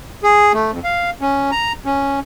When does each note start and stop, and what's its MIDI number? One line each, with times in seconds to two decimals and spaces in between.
0.24 0.52 68
0.54 0.71 57
0.71 0.80 41
0.84 1.10 77
1.21 1.51 61
1.51 1.72 82
1.86 2.20 61